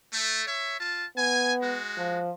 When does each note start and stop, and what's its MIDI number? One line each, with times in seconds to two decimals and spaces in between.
0.11 0.43 57
0.48 0.77 73
0.48 0.77 76
0.80 1.05 65
0.80 1.05 81
1.17 1.77 59
1.17 1.54 80
1.61 2.19 56
1.61 2.19 66
1.98 2.32 53